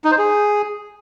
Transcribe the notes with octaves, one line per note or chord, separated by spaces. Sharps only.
D#4
C5
G#4